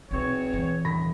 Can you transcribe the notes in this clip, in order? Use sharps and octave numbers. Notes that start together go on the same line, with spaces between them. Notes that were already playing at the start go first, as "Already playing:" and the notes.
B1 E2 C4 C#5
E3
D#1 B5 A#6